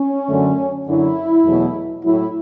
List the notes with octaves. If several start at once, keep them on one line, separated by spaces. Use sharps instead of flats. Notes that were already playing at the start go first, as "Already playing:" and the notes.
Already playing: C#4
F#2 D3 F#3 A3
F#2 D3 F#3 E4
E2 B2 F#3 A3
A2 F#3 A3 E4